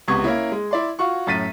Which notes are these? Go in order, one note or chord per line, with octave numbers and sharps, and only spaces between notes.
C#2 C3 B3 C#6 G#6
A#3 C#4 E4
G#3
E4 D5 C6
F4 F#4 C#6
F#2 A2 A6 B6 D#7